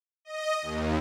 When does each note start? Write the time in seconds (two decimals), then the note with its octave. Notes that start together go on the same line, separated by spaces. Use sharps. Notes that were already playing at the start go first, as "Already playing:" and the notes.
0.25 D#5
0.62 D#2